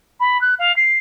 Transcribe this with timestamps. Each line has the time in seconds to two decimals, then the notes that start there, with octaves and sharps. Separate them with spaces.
0.20 B5
0.41 F#6
0.59 F5
0.76 C7